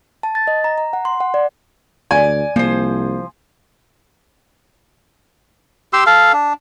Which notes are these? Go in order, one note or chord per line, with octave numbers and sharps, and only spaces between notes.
A5
A6
D#5
A#5
A#5
F#5
C6
F#5
D5
D2 D5 G#5
C2 F3 A#3 C5
G4 C6 E6
A4 F5
D4